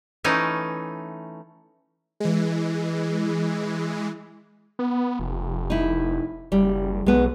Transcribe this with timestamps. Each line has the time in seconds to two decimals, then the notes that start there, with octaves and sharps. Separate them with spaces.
0.24 E3 A3 C#4 D#4
2.20 E3 G#3
4.79 B3
5.19 F1
5.70 D#4 E4
6.52 F#1 G3
7.06 B1 G#3 B3